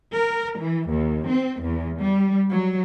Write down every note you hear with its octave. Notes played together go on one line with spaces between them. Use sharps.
A#4
E3
D#2
C4
E2
G3
F#3